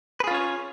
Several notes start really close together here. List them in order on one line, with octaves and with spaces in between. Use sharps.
B4 G#4 F4 C#4 C#5